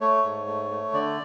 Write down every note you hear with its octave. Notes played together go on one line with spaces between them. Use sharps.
A3 C#5
G#2
A3
A3
D3 D5